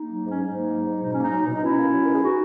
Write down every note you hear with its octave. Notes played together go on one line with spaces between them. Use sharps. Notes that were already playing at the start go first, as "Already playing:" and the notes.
Already playing: A#3 D#4
F#3
G#2 C#4
G#2 D#4
A#3
F#3
G#2
B2 D#4
C#4
A#3 D#4
F#3
B2
D#4
B2 C#4 E4
A#3
F#3
B2 A#4
G#4
D#4 F#4